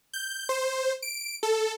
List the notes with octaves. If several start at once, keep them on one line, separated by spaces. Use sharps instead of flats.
G6
C5
D7
A4